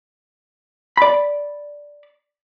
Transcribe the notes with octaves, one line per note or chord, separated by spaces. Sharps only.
D5 B5